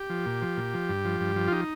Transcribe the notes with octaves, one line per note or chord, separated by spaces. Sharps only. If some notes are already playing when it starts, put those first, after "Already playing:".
Already playing: G4
F3
A#2
F3
A#2
F3
G2
F3
G2
F3
F4
D#4